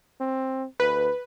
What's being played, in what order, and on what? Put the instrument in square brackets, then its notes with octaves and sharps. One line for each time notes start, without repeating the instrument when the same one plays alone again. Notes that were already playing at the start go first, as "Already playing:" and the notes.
[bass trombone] C4
[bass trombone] D2 [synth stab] B4